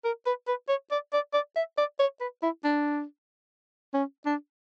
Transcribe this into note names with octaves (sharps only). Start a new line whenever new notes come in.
A#4
B4
B4
C#5
D5
D5
D5
E5
D5
C#5
B4
E4
D4
C#4
D4